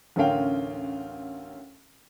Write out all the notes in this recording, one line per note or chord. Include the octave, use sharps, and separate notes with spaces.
A1 D2 C#4 A#4 F5 G5